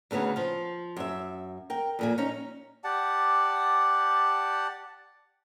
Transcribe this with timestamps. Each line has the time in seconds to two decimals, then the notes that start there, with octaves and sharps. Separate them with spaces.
0.11 D2 C#3 B3 D#4 G#4
0.36 F3 F4
0.97 F#2 E5
1.70 A#4 G5
1.99 F2 A#2 G#5
2.18 C#4 D#4
2.84 G4 D5 F#5 A5